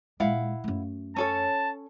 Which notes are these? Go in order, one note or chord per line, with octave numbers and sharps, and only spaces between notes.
A#2 G#3 E4 F5 F#5
F#2 A3
C#4 A4 C#5 A5